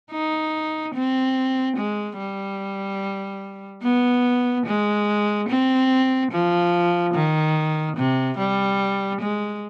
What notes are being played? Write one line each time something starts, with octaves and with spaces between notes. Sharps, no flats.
D#4
C4
G#3
G3
B3
G#3
C4
F3
D#3
C3
G3
G#3